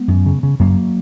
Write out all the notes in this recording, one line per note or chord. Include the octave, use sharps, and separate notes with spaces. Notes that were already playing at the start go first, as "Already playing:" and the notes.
Already playing: G#3 B3
F#2
C#3
C#3
F#2 F#3 A#3